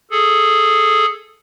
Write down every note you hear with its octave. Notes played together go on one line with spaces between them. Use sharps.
G#4 A4